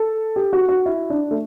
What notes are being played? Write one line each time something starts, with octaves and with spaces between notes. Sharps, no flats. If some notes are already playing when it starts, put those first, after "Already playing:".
Already playing: A4
G4
F#4
F#4
E4
D4
A3